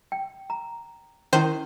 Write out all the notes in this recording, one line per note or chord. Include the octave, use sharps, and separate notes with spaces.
G5
A#5
D#3 C#4 E4 C5 C7